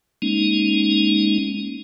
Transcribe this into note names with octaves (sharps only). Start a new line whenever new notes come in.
G#3 A#3 C#4 D#4